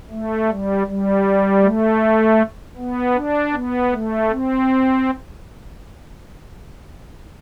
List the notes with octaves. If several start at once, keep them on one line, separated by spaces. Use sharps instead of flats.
A3
G3
G3
A3
B3
D4
B3
A3
C4